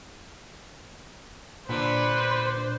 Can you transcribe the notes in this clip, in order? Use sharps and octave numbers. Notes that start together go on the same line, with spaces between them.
A#2 D3 D4 B4 C5